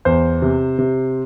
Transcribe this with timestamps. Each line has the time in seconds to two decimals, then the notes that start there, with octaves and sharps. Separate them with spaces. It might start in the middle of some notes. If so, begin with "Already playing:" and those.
0.05 E2 C5
0.42 C3
0.79 C3